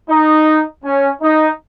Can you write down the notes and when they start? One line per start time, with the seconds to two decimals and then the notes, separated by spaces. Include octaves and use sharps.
0.10 D#4
0.84 C#4
1.22 D#4